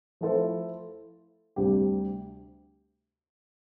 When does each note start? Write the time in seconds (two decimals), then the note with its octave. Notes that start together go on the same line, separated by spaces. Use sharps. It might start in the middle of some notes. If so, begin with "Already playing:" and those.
0.21 F3 A3 E4 A4 C5
1.56 D2 C3 G3 D4 G4